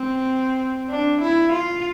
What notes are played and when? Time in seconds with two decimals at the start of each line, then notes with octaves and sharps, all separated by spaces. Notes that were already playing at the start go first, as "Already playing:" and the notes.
Already playing: C4
0.89 D4
1.21 E4
1.52 F4